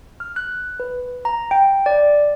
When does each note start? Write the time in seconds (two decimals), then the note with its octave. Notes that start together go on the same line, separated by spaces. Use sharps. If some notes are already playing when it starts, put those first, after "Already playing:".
0.20 F6
0.36 F#6
0.80 B4
1.25 A#5
1.51 G5
1.86 D5